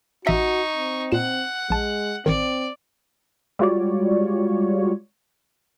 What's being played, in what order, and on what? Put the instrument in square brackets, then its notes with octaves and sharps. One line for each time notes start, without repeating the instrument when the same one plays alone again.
[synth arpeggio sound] A1 E5 C#7 [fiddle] D#4 C#6 [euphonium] F#4
[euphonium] C4
[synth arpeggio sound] A#2 E7 [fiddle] F#5
[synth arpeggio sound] A#1 A5 [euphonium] G#3
[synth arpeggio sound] A1 D#3 [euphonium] C4 [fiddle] D5
[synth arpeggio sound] G3 G#3 F4 F#4 C#5 D5